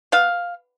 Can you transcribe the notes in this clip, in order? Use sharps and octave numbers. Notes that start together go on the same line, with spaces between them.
B3 F5